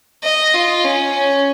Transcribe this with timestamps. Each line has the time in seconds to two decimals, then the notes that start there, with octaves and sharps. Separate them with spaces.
0.24 D#5
0.54 F4
0.84 C#4